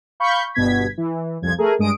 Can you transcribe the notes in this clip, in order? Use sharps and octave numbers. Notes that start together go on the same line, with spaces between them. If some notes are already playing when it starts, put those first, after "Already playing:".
F5 B5 C#6 G6
G1 G2 B2 G#6 B6
E3
C2 F2 F3 G#6
A3 G#4 A#4
G2 G#3 D#6 D7